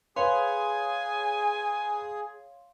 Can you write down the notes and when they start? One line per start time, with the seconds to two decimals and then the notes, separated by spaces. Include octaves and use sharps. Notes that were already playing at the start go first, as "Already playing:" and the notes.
0.16 G#4 B4 C#5 F5 G#5 C6